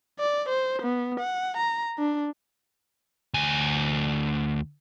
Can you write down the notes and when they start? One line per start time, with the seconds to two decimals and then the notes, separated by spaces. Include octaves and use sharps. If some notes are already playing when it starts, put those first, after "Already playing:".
0.19 D5
0.49 C5
0.82 B3
1.20 F#5
1.57 A#5
1.99 D4
3.34 D2 G#5